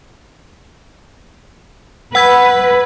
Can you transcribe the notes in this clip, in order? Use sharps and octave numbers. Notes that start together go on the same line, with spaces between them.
B4 F#5 E6 G#6